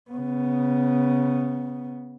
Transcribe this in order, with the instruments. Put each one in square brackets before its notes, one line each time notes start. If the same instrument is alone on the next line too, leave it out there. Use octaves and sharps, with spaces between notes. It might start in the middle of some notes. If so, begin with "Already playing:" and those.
[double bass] C#3 B3